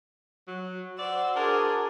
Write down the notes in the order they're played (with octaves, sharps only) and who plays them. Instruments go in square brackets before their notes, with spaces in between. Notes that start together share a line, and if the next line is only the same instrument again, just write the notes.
[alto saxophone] F#3
[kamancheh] F#4 C5 [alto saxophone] D5 [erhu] E6
[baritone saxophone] D4 [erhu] G#4 [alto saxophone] A#4